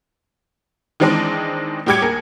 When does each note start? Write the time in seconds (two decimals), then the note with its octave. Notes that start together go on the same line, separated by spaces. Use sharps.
1.00 D#3 E3 G#3 C4 D4 D#4
1.86 A2 G3 G4 D6 G#6 C#7
2.02 D#2 G#4 A#4